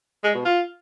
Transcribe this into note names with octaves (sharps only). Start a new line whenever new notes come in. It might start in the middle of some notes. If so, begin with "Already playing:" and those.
G#3
B2
F4